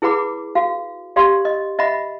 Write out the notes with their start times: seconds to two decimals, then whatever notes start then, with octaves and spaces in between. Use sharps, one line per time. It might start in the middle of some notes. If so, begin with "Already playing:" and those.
0.02 E4 G#4 B4 F#5 B5 D6
0.55 F#4 F5
1.16 G4 D5 F5 C6
1.45 D#5
1.79 D#5 E5 F#5 B5